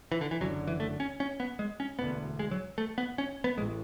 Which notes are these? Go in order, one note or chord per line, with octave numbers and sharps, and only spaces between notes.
E3
D3
E3
F#1 F#2 D3 F#3
E3
A3
C#4
C#4
B3
G#3
C#4
E1 D2 D3 B3
G#3
F#3
A3
B3
C#4
B3
A1 A2 G#3